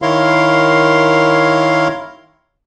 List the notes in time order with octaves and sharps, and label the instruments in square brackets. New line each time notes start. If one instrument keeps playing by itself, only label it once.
[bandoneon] D#3 E4 A#4 C#5 F5 C6